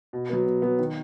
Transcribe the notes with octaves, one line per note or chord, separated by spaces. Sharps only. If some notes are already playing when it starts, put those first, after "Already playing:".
B2
F#3 B3
B2
F#3 B3
D#3